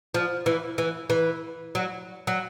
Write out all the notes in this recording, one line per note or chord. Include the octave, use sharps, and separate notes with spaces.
F3
E3
E3
E3
F#3
F#3